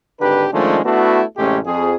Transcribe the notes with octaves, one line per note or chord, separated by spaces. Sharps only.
G#1 D3 D4 G4 B4
D#3 F3 G#3 A3 C#4 D4
A3 B3 D4 E4 F#4
A1 C3 G#3 A3 C#4 G4
F2 G#4